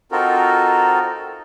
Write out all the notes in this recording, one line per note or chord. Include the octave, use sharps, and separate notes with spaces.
C4 D#4 F4 F#4 A4 A#4